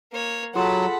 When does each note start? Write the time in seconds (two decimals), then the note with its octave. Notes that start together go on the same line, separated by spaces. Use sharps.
0.12 A#3 C#5
0.55 F#3 F4 G#4 A4 F#5 A5 B5 C6